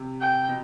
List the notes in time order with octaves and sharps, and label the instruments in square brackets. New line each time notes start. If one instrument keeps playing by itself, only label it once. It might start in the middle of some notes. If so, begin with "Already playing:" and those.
Already playing: [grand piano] C3
[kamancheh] G5
[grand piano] B2